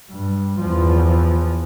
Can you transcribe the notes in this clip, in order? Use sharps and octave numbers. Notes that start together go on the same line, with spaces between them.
G2
E2 F3